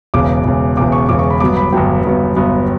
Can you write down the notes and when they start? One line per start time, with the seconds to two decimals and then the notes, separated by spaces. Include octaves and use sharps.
0.14 E1 E2 C#3 D6
0.44 E1 E2 C#3
0.77 E1 E2 C#3 D6
0.92 C#6
1.09 E1 E2 C#3 D6
1.19 C#6
1.30 B5
1.40 G1 G2 F#3 B3 D6
1.57 B5
1.73 G1 G2 F#3 B3 G5
2.04 G1 G2 F#3 B3
2.36 G1 G2 F#3 B3